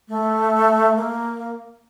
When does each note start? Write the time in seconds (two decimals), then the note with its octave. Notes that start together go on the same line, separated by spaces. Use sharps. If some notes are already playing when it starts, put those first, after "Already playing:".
0.08 A3
0.96 A#3